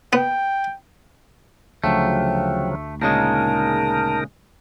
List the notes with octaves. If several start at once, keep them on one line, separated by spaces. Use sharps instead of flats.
B3 G5
D2 C#3 F3 F#3 A3 G5
A#2 C#3 G#3 D#4 A#4 A5